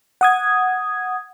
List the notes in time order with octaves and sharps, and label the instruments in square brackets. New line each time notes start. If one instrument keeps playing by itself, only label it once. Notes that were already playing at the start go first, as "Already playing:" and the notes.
[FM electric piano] F#5 D#6 G#6